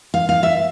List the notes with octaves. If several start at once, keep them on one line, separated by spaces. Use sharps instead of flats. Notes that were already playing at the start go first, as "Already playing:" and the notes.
F5
F5
E5